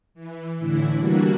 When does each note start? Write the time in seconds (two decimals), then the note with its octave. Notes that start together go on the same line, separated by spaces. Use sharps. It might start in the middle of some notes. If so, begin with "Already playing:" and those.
0.14 E3
0.59 A2 D3 E3 E4
0.96 E3 G3 A#3 D4 F#4